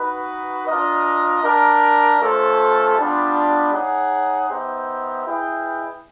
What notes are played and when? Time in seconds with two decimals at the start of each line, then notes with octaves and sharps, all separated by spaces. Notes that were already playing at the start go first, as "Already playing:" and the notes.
Already playing: D#4 F#4 B4
0.67 D4 F4 A#4 D#5
1.43 D4 G4 A#4
2.20 A3 C#4 F4 A4 C5
2.97 G3 B3 D4 F4
3.73 D#4 G#4 C#5 F#5
4.50 B3 D#4 G4 C5 E5
5.27 E4 G#4 B4 D#5 G5